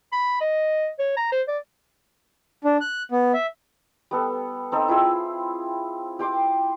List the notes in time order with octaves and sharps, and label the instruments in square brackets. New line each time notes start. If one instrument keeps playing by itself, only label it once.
[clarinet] B5
D#5
C#5
A#5
C5
D5
[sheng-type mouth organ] D4
F#6
B3
E5
[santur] G3 B3 A4
C4 D#4 A4 G5
E4 F4 G#4 E6
G4 G5 C6 D6